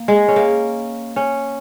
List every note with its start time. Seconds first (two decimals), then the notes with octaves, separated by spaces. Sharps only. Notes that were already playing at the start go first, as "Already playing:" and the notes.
Already playing: A#3
0.08 G#3
0.28 C#4
0.36 A#3
1.16 C#4